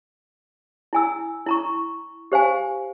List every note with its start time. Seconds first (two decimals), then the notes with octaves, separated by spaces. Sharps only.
0.93 E4 G#5 E6
1.46 E4 A#5 C#6
2.32 G4 C5 F5 G#5